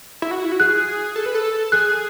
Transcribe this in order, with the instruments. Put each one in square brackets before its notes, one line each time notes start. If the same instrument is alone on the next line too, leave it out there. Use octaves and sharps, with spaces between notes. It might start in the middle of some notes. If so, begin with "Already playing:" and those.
[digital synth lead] E4
F#4
E4
F#4
[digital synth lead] G#4 [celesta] F#6
[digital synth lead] A4
B4
A4
[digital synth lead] G#4 [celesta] F#6